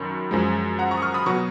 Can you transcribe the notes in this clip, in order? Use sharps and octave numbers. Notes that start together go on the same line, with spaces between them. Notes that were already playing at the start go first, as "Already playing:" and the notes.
Already playing: F#2 D#3 B5 C#6
F#2 F3 G#3
F#5 A#5
A#5 C#6
D#6
C#6 F6
B5 D#6
B2 F#3 B3 A#5 C#6